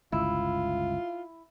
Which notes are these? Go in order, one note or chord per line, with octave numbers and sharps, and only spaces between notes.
G1 C#2 E4 F4